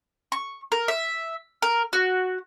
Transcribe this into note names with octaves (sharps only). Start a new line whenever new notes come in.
C#6
A#4
E5
A#4
F#4